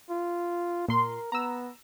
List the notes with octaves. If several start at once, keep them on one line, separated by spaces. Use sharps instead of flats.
F4
A#2 A#4 C6
B3 A#5 E6